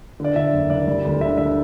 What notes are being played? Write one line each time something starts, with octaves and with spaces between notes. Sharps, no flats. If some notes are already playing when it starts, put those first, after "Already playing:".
D3 D5
D3 E5
F#1
F#1 D5
G3
D2
D3 E5
D3 E5